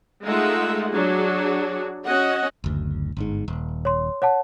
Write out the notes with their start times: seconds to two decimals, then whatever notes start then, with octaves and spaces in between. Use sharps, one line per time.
0.25 G#3 A3 D#4 F4 E5 F#5
0.92 F#3 D4 F#4 G#4
2.05 C#4 F#4 D#5 F#5
2.64 F#1 D2
3.17 G1 G#2
3.48 D#1
3.85 C#5 C6
4.22 C#5 F#5 A5